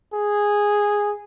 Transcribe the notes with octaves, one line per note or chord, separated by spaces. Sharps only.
G#4